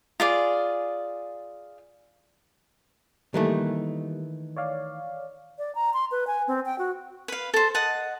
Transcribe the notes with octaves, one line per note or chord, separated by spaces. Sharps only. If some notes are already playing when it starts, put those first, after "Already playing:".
F4 G#4 D5
D#3 E3 G3 A3 A#3
C#5 D5 F5
D5
A#5
C6
B4
G#5
C4
G5
F#4
B4 F5
A4 C5
D#5 F#5 A5